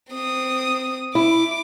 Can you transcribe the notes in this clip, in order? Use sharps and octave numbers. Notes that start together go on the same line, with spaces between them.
C4 D#6
E4 D6